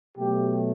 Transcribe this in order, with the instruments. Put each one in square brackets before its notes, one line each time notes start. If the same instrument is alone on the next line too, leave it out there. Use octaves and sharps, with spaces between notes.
[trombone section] B2 F#3 A3 G4